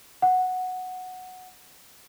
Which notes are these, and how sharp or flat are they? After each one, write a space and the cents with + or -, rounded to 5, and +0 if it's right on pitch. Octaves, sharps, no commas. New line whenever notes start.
F#5 -5